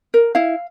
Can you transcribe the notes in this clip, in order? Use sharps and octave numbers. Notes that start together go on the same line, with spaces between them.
A#4
E4 F5